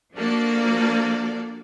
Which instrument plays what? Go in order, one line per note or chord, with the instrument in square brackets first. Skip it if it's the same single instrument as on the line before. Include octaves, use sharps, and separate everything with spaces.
[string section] F3 A#3 D4 F#4 A4 D5